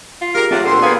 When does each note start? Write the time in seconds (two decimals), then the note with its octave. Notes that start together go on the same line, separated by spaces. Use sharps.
0.21 F4
0.35 G4 G#4 A#4
0.51 F#3 A3 C4 F4 D5 F#5
0.65 D2 A#2 D3 C4 A4 C6
0.83 A#3 B3 G#4 B4 F5